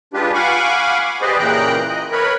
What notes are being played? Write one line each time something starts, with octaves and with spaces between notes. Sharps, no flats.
G#3 D4 F4 G4 B4
F5 F#5 G#5 B5 C#6 D6
G4 G#4 B4 C5 D5 D#5
A#2 C#3 E3 G5 A#5 F#6
D#5
A#4 B4 C#5 B5